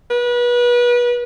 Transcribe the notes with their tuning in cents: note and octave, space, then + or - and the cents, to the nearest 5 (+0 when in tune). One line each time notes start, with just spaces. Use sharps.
B4 -30